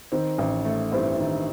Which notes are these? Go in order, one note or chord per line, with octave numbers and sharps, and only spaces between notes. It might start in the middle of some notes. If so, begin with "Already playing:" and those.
D#3 C4
A1
A3
G2 C4 E4
D#3